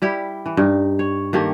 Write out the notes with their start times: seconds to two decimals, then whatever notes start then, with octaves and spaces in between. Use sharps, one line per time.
0.02 G3 E4 G4
0.46 E3
0.57 G2 D#4
0.99 C#5
1.33 D#3 A#3 G4 A4